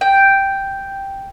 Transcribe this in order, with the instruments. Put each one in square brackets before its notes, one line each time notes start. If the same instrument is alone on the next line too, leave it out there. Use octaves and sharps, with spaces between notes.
[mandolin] G5